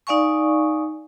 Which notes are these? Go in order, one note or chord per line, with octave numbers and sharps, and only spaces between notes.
D#4 D5 F5 G#5 C#6